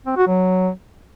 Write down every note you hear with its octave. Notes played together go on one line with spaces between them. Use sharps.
C4
F#4
F#3